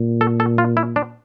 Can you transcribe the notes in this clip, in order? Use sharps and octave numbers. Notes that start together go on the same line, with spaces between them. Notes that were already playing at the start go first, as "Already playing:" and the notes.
Already playing: A#2
A4
A4
F4
E4
D4